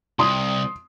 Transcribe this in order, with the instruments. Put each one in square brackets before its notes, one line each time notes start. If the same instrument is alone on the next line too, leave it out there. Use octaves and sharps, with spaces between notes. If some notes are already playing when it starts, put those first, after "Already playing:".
[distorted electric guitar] C2 [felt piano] C6 D#6